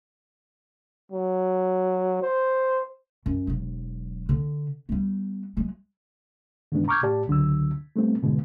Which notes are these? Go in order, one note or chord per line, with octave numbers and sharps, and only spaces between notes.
F#3
C5
F#2
E1 F#3
D3
G3 B3
F#3 G#3
E2 G2 D#3 G#3 B3 D4
A#5 C#6 D6 F6 G6 G#6
A2 G4 D5 A5
C#2 D3 F#3 E6
G3 A3 B3 C4
G#2 B2 D3 G#3 B3